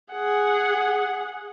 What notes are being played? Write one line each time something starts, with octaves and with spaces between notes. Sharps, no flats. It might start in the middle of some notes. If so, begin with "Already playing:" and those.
G#4 F#5